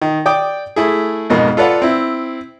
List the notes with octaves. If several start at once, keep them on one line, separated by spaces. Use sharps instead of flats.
D#3
D5 G5 D6 D#6
A3 E4 G#4
F2 G#2 B2 A#3
F4 A4 B4 D5 F5 F#5
C4 E4